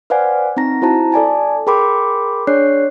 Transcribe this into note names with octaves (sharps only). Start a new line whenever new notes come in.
B4 C5 D5 F5 F#5 G#5
C4 D#4 A#5 A#6
E4 F#4 C5 A5 A#5
A4 D5 G#5 A5
G#4 A#4 G5 B5 C6 D6
D4 G#4 C#5 D5 F#6 C7